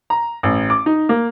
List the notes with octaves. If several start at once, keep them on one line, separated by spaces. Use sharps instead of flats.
A#5
A1
D6
D#4
A#3